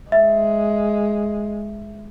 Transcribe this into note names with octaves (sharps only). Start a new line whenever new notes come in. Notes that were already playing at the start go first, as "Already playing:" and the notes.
G#3 E5